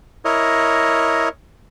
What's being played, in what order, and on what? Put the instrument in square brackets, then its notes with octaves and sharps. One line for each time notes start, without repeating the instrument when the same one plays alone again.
[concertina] E4 A#4 C#5 D#5